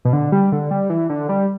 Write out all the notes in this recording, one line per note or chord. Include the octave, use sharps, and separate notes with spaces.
B2
D3
G3
D3
G3
E3
D3
G3